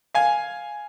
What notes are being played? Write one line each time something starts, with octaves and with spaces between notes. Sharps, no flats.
F5 G#5